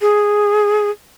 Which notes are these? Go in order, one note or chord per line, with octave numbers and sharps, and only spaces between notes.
G#4